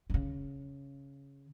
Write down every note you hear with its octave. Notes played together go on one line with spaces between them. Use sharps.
D3
C#3